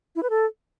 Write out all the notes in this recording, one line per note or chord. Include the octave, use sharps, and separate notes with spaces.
E4
B4
A4